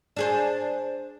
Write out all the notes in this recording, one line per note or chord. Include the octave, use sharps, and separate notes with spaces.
D4 G#4 C5